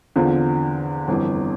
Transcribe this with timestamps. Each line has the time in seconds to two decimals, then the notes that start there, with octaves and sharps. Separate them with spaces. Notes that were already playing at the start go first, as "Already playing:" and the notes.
0.16 E2 D3 F3 C4 F4
1.08 G1 F2 E3